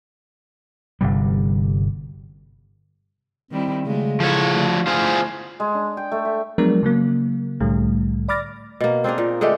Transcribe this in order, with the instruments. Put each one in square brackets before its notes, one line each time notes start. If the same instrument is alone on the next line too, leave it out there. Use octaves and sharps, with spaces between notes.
[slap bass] G1 C3 G3
[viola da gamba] D#3 G3 E4 [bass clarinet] C4
[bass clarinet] C#3 [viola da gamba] F#3 G#3 A3
[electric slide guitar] F3 C#5 [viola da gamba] E4 A4
[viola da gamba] D3 A3
[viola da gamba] A3 E4 [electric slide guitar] F4 G#4 C5
[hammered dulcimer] G#3
D4
G5
A3
E5
[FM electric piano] F3 F#3 G#3 B3 D4 A#4
C#3 F#3 A#3
C2 A2 D3 G3 A3
D5 B5 D6 F6 A6 A#6
[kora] B2 A#3
C4 D4 G#4 A#4
A#2
D3 G#3 A3 G4